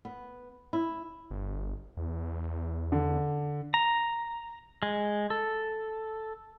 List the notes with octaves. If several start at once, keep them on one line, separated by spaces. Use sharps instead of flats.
B3
E4
G1
E2
D3
A#5
G#3
A4